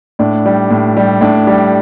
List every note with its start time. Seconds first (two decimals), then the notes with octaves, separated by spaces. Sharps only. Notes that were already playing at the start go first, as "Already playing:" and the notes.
0.19 A2 D4
0.46 G3
0.70 A2
0.97 G3
1.21 A2 D4
1.47 G3